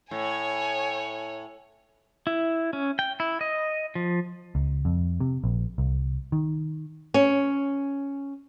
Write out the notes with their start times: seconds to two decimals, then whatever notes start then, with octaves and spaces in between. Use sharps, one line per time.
0.11 A2 C#5 G#5
2.27 E4
2.73 C#4
2.99 G5
3.20 E4
3.41 D#5
3.95 F3
4.55 C#2
4.85 F2
5.20 C3
5.44 A#1
5.78 C2
6.32 D#3
7.14 C#4